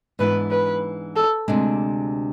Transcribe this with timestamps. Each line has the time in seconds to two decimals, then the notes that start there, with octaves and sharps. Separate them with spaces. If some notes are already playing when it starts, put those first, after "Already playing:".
0.19 G#2 E3 B3 D4 B4
0.51 B4
1.16 A4
1.48 D2 C3 G#3 D4